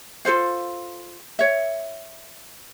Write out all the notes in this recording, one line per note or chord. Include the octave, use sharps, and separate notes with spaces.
F4 A4 C5 F5
C#5 E5